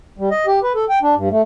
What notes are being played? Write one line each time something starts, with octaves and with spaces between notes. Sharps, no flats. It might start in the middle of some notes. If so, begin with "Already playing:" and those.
G3
D#5
G4
B4
A4
G5
D4
G2
A3